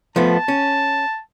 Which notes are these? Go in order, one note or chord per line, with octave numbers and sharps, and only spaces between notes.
F3 A3 B3 A5
C#4